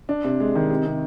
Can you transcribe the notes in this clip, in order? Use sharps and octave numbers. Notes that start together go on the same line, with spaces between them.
D4
C3
G#3
D#3
C3
C3